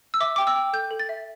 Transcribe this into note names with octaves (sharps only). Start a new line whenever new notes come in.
E6
E5 D6
G5 D6
E6
G5
A4 G6
A4
A6
E5